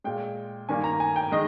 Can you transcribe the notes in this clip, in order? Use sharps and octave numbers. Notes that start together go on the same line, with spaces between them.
A#2 G#3 G5
G2 D#3 G3 A#3 G#5
A#5
G#5
G5
D#3 G#3 D#5